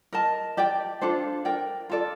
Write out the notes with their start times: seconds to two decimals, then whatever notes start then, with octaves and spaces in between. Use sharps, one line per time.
0.13 A#4 D#5 A5
0.57 G4 D5 G5
1.01 D4 F4 A4 C5
1.45 A#4 D5 G5
1.90 F4 A4 D5